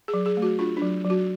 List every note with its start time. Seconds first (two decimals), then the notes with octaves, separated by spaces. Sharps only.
0.08 G#4
0.14 F#3
0.26 G#4
0.37 A3
0.42 F#4
0.59 D4 F4
0.77 D4
0.82 F#3
1.05 F#3
1.10 F#4